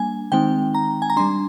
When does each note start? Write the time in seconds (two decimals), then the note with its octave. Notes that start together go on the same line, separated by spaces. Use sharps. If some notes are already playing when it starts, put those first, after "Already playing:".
Already playing: G3 A#3 D4 G#5
0.32 D#3 G#3 C4 D#4 G5
0.75 A#5
1.02 G#5
1.10 A#5
1.17 G3 D4 C6